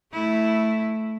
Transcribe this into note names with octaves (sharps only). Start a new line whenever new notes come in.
A3 E4